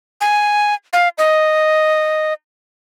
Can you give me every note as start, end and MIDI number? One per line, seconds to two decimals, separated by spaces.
0.21 0.74 80
0.93 1.09 77
1.18 2.33 75